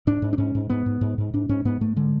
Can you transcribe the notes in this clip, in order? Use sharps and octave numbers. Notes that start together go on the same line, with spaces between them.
G#2 D4
G#2
D4
G#2 C#4
G#2
G#2 B3
G#2
G#2
G#2
G#2 D4
G#2 C#4
G#2 B3
G#2 A3
D3 G#3